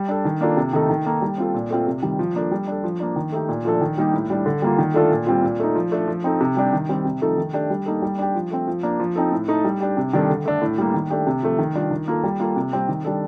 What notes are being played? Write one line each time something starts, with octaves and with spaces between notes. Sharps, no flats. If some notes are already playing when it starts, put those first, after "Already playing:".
Already playing: G3
D4 A4
D#3
A#3 D4 F4 A4
C3
D#3 A3 D#4 A4
D#3
A#3 D#4 A4
G3
C4 F4 A4
A#2
A3 C4 F4
C3
D#3 G3
F3
A#3 D4 A4
G3
D4 A4
F3
A#3 D4
D#3
A3 D#4 G4
A#2
F3 A3 D4 A4
D#3
G3 A#3 D#4 G4
A2
G3 D4
D3
G3 A#3 F4
D#3
A3 D4 F4 A4
A#2
G3 C4 F4
A#2
A3 D#4
F3
A3 D4 A4
F3
C4 D#4 A4
C3
G3 D4 G4
D#3
G3 C4
C3
F3 A3 D#4 A4
D#3
A3 D4 G4
G3
A#3 D#4 A4
G3
D4 G4
F3
A3 C4
F3
A#3 D4
F3
C4 D#4 A4
A2
A3 D#4 A4
G3
D4 G4
C3
D#3 G3 D4 A4
D3
A3 D4 A4
A2
G3 A#3
D#3
A3 D4 G4
C3
F3 A3
D#3
G3 D4 F4
D#3
A#3 F4 A4
G3
A#3 F4 A4
C3
G3 C4 G4
D#3
G3 D4 A4